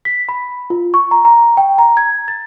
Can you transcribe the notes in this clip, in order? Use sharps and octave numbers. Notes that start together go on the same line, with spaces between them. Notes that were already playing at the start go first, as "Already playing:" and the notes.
B6
B5
F4
C#6
A#5
A#5
G5
A#5
G#6
A6